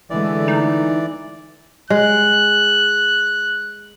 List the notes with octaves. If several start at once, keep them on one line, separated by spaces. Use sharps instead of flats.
D3 E3 G#3 A3 D5
D#4
G#3 F#6